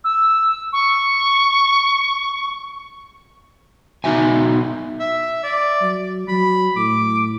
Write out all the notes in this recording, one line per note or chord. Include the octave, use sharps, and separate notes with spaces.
E6
C#6
B2 D#4 F#4 E5 G#5
E5
D5
F#3
F#3 B5
A2 D6